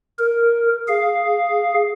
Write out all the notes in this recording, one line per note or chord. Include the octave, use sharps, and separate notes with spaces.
A#4
G#4 F5